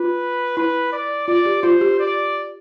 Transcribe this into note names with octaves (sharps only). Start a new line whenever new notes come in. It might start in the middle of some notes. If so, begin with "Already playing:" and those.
Already playing: F4 B4
E4 B4
D5
F4 D5
G4
F4 C5
G4
D5